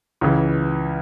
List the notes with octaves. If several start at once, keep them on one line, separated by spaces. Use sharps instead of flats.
C#2 C#3 E3